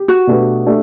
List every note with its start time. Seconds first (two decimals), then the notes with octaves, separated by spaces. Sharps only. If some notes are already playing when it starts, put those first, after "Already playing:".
Already playing: G4
0.08 F#4
0.27 B2 A3 D4 G4 B4
0.66 A3 D4 G4